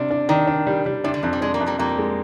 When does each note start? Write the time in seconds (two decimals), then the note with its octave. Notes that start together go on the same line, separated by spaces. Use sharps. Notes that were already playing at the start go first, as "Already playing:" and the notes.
Already playing: C3 G3 D4
0.11 D4
0.29 D#3 D4
0.47 D4
0.67 G3
0.86 G3
1.04 C3 D4
1.14 D3
1.23 F2 F3
1.33 G3
1.41 G#3 D4
1.54 G3 A#3
1.61 F2
1.66 G3 A#3
1.79 F2 G3 A#3
1.98 G#3